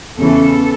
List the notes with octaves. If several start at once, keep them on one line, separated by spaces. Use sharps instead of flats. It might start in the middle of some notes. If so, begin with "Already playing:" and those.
E2 C#3 E3 A4